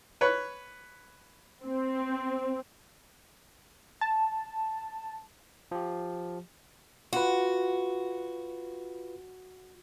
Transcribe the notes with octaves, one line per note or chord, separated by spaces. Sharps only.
B4 C#5
C4
A5
F3 G4
F4 F#4 B4